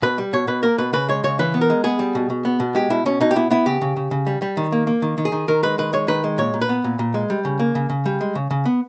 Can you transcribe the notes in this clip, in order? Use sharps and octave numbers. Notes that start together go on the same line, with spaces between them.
B2 B4
G3
B2 C#5
B2 B4
A#3 A#4
B2 B4
C#3 B4
G#3 C#5
C#3 C#5
E3 B4
B3
A#4
G#3
B3 G#4
G3
B2
B2
B3
B2
G#3 G4
B2 E4
B2 C#4
B2 D#4
G4
B3 E4
B3 E4
C#3 G4
C#3
C#3
C#3
G3
G3
D#3
A#3
A#3
D#3
D#3
G#4
D#3
D#3 A#4
G#3 B4
D#3 B4
G#3 C#5
D#3 B4
G#3
A#2 C#5
A#2
B4
B3
A#2
A#2
G#3
G3
C#3
A#3
C#3
C#3
G3
G#3
C#3
C#3
B3